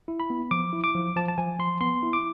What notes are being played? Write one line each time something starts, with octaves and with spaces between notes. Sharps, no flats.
E4
B5
B3
F3 D6
E4
D6
F3
F3 A5
A5
F3 G#5
F3 C6
B3 C6
E4
D6